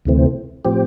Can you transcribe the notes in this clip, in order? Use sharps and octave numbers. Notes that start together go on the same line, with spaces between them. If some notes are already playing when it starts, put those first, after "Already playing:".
D2 C3 E3 A3 C4
A2 F3 C4 G4